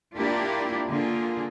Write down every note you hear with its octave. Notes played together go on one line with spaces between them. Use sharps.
A#3 D4 E4 F4 G4
D3 A#3 F4 G#4